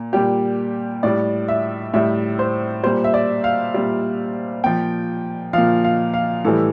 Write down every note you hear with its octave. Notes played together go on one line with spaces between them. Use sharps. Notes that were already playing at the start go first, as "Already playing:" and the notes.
Already playing: A#2
A#2 G3 G4
A2 G3 D5
E5
A2 G3 E5
C5
A#2 G3 C5
E5
D5
F5
A#2 G3
A#2 F3 G5
A#2 F3 F5
F5
F5
A2 E3 G3 A4